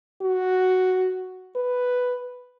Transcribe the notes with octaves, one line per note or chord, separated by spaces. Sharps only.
F#4
B4